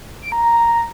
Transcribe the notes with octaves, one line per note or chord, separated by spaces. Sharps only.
D7
A#5
A#5